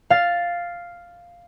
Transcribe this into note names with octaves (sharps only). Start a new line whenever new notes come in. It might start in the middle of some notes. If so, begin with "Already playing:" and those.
F5 A6